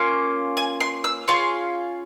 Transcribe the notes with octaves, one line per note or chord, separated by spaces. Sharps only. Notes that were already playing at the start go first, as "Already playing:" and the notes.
Already playing: A#3 C#4 F4
G#5
C6
E6
C#4 F4 G#4 C6